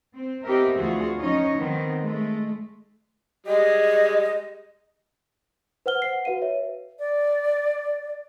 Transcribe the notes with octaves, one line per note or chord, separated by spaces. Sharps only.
C4
B3 C4 D#4 G4 A#4 E5
D2 E3 F4 F#4 G#4
F3 C#4 D#4 C#5 D#5
D#3 B3 C4
G#3 A3
G3 G#3 G#4 D#5
B4 C5 F#5 F6 G7
F#5 C7
F#4 B4 F5 D#7
B4 C#5 E5
D5